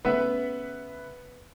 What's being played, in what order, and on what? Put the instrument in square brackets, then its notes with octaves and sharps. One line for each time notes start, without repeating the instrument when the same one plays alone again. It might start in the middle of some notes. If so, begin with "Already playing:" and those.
[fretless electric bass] C#3 A3 C#4 [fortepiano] B3 [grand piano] B4 E5 F#5